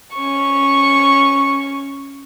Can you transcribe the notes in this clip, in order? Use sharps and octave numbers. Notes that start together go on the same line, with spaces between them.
C#4 C#6